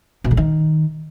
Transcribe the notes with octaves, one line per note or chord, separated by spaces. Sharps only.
B2
D3
D#3